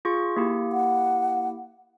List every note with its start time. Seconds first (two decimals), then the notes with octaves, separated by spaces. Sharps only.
0.05 F4 G#4 C#6
0.36 A#3 E4 G4
0.72 F#5